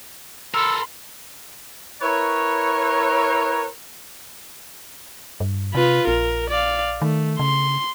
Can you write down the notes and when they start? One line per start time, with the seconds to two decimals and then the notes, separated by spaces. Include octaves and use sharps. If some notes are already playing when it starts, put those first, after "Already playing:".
0.54 A4 A#4 B5 C6 E6
2.01 E4 A#4 B4 C#5
5.40 G2
5.75 C3 F4 B4
6.07 A#1 A#4
6.50 D5 F5
7.02 D#3 A3
7.39 C#3 C6